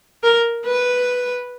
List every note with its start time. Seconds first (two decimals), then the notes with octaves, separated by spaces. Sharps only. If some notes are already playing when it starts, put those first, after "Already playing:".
0.23 A#4
0.66 B4